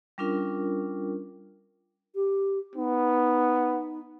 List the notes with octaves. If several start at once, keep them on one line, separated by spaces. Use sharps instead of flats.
G3 C#4 D4 F4 A#4
G4
B3 D#4